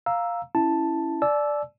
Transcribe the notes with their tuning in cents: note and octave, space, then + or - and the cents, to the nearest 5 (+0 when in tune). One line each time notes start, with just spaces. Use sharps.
F5 +0 A#5 +0 E6 +0
C#4 +0 E4 +0 A5 +0
D5 +0 A5 -45 E6 +0